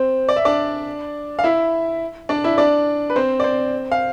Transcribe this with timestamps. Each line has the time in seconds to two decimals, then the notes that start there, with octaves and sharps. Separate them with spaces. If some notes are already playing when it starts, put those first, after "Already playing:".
Already playing: C4 C5
0.29 D5
0.36 E5
0.45 D4 D5
1.39 F5
1.44 E4 E5
2.29 D4 D5
2.44 E4 E5
2.58 D4 D5
3.10 B4
3.16 C4 C5
3.40 D5
3.44 C4 C5
3.92 F5